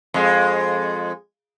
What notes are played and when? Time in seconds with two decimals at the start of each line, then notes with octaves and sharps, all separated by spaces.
0.14 F2 G#3